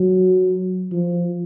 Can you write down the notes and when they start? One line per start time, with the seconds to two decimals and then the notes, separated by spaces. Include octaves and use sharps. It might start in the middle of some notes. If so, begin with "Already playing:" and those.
Already playing: F#3
0.92 F3